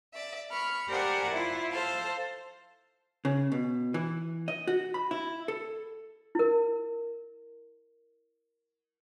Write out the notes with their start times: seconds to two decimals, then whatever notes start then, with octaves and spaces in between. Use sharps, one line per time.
0.13 D5 E5
0.51 B5 C#6 F6
0.88 G4 A#4 C5 D5 F#5 G#5
1.33 E4 F4
1.72 A4 C5 F5 A5
3.25 C#3
3.52 B2
3.94 E3
4.48 D#5
4.67 F#4
4.94 B5
5.11 E4
5.48 A4
6.35 E4 A#4